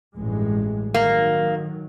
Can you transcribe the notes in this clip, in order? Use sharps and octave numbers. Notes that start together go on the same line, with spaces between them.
A1 G2 G#3
D#3 F#3 A#3